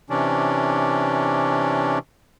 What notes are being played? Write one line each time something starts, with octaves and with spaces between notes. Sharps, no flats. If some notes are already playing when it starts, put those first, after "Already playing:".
C3 E3 C#4 D4